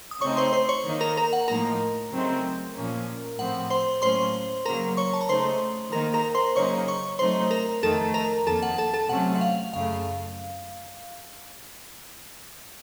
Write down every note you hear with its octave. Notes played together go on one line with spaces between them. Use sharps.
D#6
C#3 A3 C4 D#4 C#5 C#6
C5 C6
C5 C6
C#5 C#6
D#3 A#3 D#4
A#4 A#5
A#4 A#5
F#5
A2 F3 A#3 D#4 A#4 A#5
C#3 F#3 A3 C4 D#4
A#2 F3 A#3 C#4
A2 F3 C4 F#5
C5 C6
A2 F#3 A#3 C#4 C5 C6
C#3 F#3 A#3 A#4 A#5
C#5 C#6
A5
A#5
C#3 A3 D#4 C5 C6
D#3 A#3 D#4 A#4 A#5
A#4 A#5
C5 C6
C#3 F#3 A#3 D#4 C#5 C#6
C#5 C#6
C3 F#3 A3 D#4 C5 C6
A#4 A#5
F2 D#3 A3 D#4 A4 A5
A#4 A#5
F2 D#3 A#3 A4 A5
F#5
A4 A5
A4 A5
C3 F#3 A3 C#4 F#5
F#5
F5
F#2 C#3 A3 F5